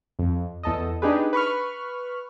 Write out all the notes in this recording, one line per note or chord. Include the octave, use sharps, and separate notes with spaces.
F2
E2 A4 D#5
D4 D#4 G4 G#4 B4
B4 B5 C#6 F6